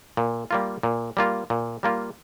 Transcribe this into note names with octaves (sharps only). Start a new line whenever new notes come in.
A#2
G3 A#3 F4
A#2
G3 A#3 F4
A#2
G3 A#3 F4